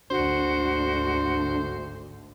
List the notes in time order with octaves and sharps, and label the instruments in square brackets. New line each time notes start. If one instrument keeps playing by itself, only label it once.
[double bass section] G#1 D2 D3 [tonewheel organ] D4 [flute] F#4 [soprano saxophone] C5